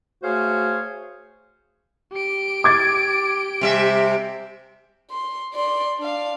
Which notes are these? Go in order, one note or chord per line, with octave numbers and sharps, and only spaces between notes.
A3 F#4 G#4 C5 C#5 F5
G4 D7
D6 G#6 A6
C3 G3 E5
C6
D5 C6
D4 F5